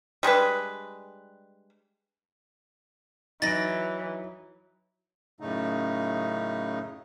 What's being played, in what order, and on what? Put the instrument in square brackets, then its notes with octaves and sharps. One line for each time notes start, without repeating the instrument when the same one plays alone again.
[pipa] G3 G#3 D4 B4
[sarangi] E3 [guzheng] F#3 [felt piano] D#4 D7 [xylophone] A6 A#6
[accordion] F#2 A2 C#3 A3 D#4